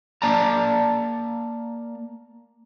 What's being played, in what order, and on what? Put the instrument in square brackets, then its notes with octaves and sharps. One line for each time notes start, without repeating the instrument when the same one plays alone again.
[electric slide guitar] A#3 D5 A5 A#5